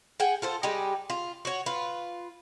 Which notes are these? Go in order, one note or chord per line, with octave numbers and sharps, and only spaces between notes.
G#4 F#5 G5
F4 A4 C5
G3 G#3 D#4 G4
F4
F#4 C#5
F4 B4